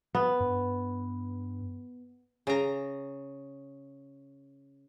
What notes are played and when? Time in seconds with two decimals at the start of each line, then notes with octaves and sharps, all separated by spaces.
0.15 B3
0.40 G2
2.47 C#3 A#5